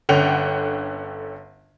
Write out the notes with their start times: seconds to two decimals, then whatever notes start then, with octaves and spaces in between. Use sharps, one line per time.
0.09 G1 D3 C#4 F#5 G5 F7